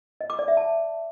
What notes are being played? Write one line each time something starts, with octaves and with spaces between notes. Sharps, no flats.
D#5
D6
D5
E5
A5